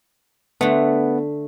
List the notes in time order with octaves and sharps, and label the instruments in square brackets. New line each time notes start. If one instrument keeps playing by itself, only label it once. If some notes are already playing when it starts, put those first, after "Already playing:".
[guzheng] D3 A3 [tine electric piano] B3